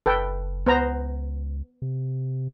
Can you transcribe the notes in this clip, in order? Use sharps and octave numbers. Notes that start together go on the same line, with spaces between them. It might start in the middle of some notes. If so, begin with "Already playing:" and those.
F#1 A4 B4 G5
C#2 B3 C5 A#5
C3